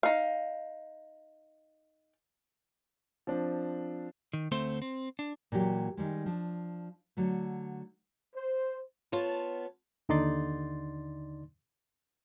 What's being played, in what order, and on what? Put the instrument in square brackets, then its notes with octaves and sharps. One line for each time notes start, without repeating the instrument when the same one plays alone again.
[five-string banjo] D#4 F5
[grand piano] F3 C4 D4
[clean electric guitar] D#3
D2 A3 C4 C5
C4
D4
[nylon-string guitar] A#2 E3 F#3 G4
D#3 G3 G#3
F3 D4
D3 F#3 A3
[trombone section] C5
[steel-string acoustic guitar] B3 F4 C#5 A5
[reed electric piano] D#2 D3 D#4 D5 C6 A6